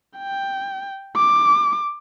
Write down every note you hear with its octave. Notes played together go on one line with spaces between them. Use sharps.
G5
D6